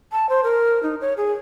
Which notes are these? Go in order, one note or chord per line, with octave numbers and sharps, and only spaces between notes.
A5
C5
A#4
D#4
C#5
G#4